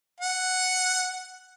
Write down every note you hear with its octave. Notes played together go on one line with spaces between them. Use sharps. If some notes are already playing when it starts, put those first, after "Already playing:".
F#5